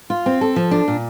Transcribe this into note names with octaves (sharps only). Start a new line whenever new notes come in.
F4
C4
A4
F3
D4
A#2